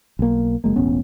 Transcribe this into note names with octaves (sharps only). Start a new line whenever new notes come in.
B1 A#3
F#1 G#3 A#3
E1 A1 B3 C#4